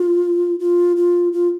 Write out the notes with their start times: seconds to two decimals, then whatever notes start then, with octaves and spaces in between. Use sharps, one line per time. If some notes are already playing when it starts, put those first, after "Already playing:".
Already playing: F4
0.60 F4
0.97 F4
1.33 F4